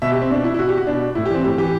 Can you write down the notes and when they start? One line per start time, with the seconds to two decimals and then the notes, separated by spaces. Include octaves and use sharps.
0.02 B2 E5
0.12 G4
0.22 C4
0.30 B2 D4
0.44 E4
0.54 E4
0.59 B2 F#4
0.69 G4
0.77 F#4
0.87 B2 D4
1.15 A2 E4
1.26 G4
1.30 E3 C4
1.44 A2 G4
1.58 E3 G4